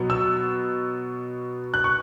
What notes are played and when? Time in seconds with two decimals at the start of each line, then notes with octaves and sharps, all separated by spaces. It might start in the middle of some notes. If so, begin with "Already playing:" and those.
Already playing: B2 F#3 B3
0.10 E6
1.74 F#6
1.84 C#6